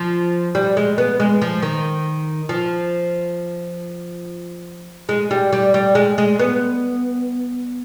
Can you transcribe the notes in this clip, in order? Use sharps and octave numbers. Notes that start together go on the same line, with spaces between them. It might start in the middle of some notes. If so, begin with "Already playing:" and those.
Already playing: F3
G3
G#3
B3
G#3
F3
D#3
F3
G#3
G3
G3
G3
G#3
G#3
B3